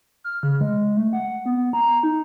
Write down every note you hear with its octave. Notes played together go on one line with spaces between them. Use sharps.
F6
C#3
G#3
A3
F#5
B3
A#5
D#4